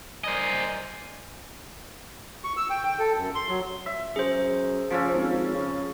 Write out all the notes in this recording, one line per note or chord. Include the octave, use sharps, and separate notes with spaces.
A#4 C5 D5 D#5 G#5
C#6
E6
G5
G5
A4
F#2
C6
F#3
E5
F#2 G#4 C5
C#3 F3 C#4 A4
G#1
C#3